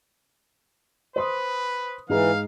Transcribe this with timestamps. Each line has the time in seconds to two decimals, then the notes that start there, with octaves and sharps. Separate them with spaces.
1.16 B4 C5 C6 D#6
2.09 G#2 E3 G#4 F5 A#5